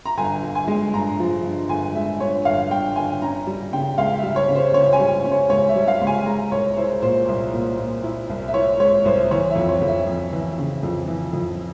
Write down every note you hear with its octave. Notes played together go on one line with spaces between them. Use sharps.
A#5
G1 G#5
G1
G#5
G#3
G2 A#5
F3
G2
G1 G#5
G#3 E5
G2 C#5
G1 F5
G2 G5
G1 G#5
C#4 A#5
G3
C#3 G5
C#2 F5
E5
G3
C#5
C#3
C5
C#3 C#5
G#5
G3
C#4
C#5
C#2 C#5
E5
G3
F5
C#2
G#5
G#3 A#5
C2 C#5
E4 C5
A#2 C5
C2
A#2
A#2
E4
C2
E5
E4 C#5
G#3 C#5
C2 C5
E3 C#5
E5
F2
C#5
F2
E5
F2
E3
C#3
F2
E3
F2